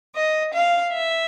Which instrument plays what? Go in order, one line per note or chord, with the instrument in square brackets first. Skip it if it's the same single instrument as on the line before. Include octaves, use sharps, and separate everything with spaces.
[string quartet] D#5
F5
E5